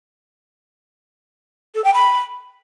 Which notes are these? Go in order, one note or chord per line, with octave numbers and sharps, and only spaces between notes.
A4
G5
B5